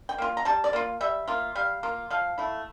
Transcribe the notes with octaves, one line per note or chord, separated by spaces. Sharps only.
G5
A#3 F4
A#5
G3 A5
D5
A#3 F4
G3 E5
A#3 F4
G3 F5
A#3 F4
F3 F5
A3 E4